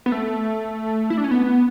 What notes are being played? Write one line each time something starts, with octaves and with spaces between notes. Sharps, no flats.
B3
A3
E4
D4
C#4
B3